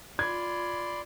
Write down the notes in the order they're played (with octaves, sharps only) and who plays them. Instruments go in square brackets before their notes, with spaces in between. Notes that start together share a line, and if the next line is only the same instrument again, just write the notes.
[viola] F4 [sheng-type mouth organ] D5 C6 [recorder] B5 [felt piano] G#6